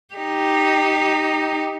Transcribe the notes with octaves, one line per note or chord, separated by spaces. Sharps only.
D#4 G4